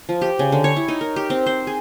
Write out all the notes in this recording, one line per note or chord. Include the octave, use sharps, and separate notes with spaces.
F3
G4
C#3
D3
C#5
E4
D#4
A#4
G4
C4
C5
G#4